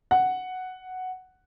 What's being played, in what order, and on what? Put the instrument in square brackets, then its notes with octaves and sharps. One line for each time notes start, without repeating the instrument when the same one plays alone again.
[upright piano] F#5